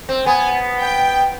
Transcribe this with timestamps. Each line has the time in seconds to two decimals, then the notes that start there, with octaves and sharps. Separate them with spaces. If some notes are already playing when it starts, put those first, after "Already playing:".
0.09 C4
0.26 B3 G#5
0.80 G5